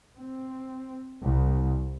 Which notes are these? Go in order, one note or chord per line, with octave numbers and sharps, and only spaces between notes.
C4
C2